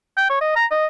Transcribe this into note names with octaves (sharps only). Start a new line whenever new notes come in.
G5
C#5
D#5
A#5
D#5